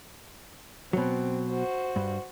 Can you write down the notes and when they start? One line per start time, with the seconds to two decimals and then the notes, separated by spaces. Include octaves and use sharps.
0.93 B2 F#3 C4
1.48 F#4 C5
1.96 G2